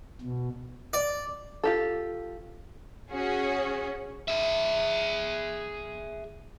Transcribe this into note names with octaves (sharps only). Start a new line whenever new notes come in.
B2
D5
F4 G4 A4
C#4 F#4 G#4
G#4 E5